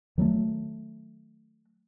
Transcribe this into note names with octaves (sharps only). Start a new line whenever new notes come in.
D#3 F#3 G3 A3